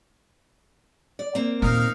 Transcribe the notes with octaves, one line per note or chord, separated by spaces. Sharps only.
D5
A#3 C4
D#2 A#2 D#4 A#4 F5